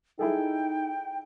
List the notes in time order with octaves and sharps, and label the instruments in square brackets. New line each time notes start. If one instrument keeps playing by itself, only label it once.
[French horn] D#4 [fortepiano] E4 G#4 A4 [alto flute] G5